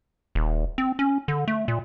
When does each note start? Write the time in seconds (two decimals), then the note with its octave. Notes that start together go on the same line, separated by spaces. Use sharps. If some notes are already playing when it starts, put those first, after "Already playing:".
0.35 D#1
0.78 C4
0.99 C#4
1.28 D3
1.48 A3
1.68 A#2